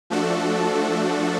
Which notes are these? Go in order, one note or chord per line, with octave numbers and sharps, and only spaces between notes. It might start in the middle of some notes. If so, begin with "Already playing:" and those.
F3 A3 D4 F#4 A4